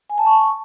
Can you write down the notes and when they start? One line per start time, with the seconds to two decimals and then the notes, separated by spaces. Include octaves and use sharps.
0.10 G#5
0.18 A5
0.26 C#6